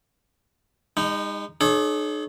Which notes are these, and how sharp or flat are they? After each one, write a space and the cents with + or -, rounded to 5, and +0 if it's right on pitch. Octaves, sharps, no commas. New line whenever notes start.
G#3 -40 D#4 +0
D#4 -45 G#4 +45 C#5 -20